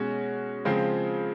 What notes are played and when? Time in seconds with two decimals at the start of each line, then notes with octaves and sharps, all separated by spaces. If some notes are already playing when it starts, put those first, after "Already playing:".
Already playing: B2 G#3 C#4 F#4
0.65 C#3 F3 G#3 C4 F4